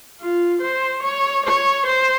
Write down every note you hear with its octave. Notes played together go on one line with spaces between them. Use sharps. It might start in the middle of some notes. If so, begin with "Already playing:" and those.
F4
C5
C#5
C#5
C5